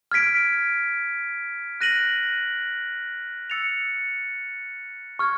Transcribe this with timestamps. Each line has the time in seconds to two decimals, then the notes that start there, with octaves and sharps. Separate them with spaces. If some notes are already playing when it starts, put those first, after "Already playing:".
0.12 F6 G#6 B6 D7
1.81 F#6 A#6 D#7 F#7
3.50 E6 A6 C#7 F7
5.19 C#6 F6 G#6